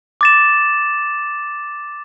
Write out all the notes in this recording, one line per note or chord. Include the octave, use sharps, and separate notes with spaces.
D6 A6 E7